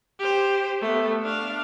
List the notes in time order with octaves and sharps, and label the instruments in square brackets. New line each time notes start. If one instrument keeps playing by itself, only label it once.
[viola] G4 C5
A3 B3
D4 F5